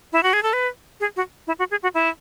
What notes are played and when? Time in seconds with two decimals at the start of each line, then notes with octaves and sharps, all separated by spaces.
0.13 E4
0.23 F#4
0.33 G#4
0.43 A4
0.53 B4
1.00 G#4
1.16 F#4
1.47 E4
1.59 F#4
1.71 G#4
1.83 F#4
1.94 E4